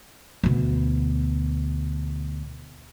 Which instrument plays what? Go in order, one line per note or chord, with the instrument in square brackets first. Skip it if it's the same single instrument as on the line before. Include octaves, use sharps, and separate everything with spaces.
[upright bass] D2 B2